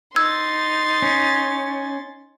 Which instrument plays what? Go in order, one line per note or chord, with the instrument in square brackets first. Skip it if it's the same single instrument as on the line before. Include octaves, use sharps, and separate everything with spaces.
[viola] D#4 [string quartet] C6 A6 [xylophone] E6 G#6
[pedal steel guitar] C#4